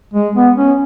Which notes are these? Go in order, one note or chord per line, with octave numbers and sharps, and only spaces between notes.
G#3
B3
C#4